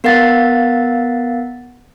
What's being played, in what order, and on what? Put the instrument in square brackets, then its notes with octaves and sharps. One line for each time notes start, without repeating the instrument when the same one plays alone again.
[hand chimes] B3 A#4 F5 F#5 A6